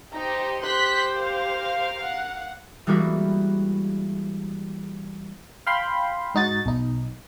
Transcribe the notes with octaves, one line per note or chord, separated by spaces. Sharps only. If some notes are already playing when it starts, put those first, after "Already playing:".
D#4 G4 C5 A#5
G4 C5 C6 F#6 B6
A#4 F5
F#5
E3 G3 G#3 A#3 F#4 B4
F5 G5 B5 C6
G#2 D#4 F#4 A6
B1 D#4